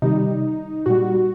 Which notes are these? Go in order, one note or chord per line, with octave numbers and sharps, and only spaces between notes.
C3 D#3 G3 D#4
A#2 G3 F#4